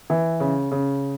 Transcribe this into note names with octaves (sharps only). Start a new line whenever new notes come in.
E3
C#3
C#3